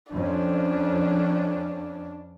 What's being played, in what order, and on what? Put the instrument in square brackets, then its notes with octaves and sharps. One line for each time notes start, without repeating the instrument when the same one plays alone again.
[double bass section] F2 C#4 [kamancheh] D4